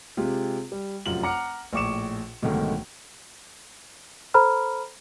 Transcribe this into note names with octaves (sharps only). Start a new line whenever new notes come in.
C3 G#3 F4 G4
G3
F1 F#2 F4 F#7
F#5 A#5 D6 F6 C#7
A#1 A2 C#6 D6 C#7 E7
B1 G#2 D3 D#3 A3
A4 C5 A#5 B5 F6